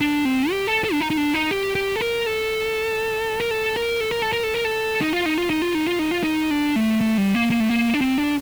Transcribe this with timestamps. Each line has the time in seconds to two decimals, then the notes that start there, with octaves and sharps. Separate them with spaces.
0.01 D4
0.25 C4
0.50 G4
0.67 A4
0.84 A4
0.92 D4
1.00 D#4
1.10 D#4
1.17 D4
1.34 D#4
1.51 G4
1.75 G4
1.96 A4
2.01 A#4
2.26 A4
3.40 A#4
3.51 A4
3.76 A#4
4.01 A4
4.11 A#4
4.22 A4
4.33 A#4
4.43 A4
4.54 A#4
4.65 A4
5.01 D#4
5.13 F4
5.26 D#4
5.38 F4
5.50 D#4
5.62 F4
5.75 D#4
5.87 F4
5.99 D#4
6.11 F4
6.23 D#4
6.51 D4
6.76 A3
7.01 A3
7.18 G3
7.34 A#3
7.51 A#3
7.60 A3
7.69 A#3
7.94 D4
8.01 C4
8.18 D4